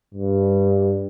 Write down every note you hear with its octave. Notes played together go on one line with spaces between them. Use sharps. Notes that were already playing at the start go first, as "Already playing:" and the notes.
G2